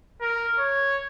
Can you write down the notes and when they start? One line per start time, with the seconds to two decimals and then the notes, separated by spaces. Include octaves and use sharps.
0.21 A#4
0.58 C#5